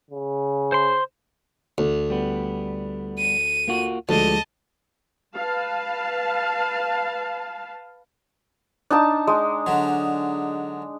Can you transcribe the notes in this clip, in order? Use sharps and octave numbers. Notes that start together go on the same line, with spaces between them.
C#3
C5 C6
D2
G3 B3
D#7
A#3 F4 F#4
D2 F3 G#3 D#5 A5
B4 F5 A5
D4 D#4 A5
G#3
D3 F#3